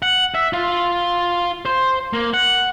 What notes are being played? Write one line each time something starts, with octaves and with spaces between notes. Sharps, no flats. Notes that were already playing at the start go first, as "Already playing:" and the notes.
F#5
E5
F4
C5
A#3
F#5